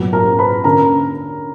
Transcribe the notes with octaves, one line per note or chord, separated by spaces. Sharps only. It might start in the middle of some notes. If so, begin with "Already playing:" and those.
Already playing: A#2 F#3 B3
A#4 A#5
B4 B5
D3 A#3 C#4 A#4 A#5